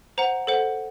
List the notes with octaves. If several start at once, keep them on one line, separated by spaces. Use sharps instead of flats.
C5 F#5 A#5
A4 C5 F#5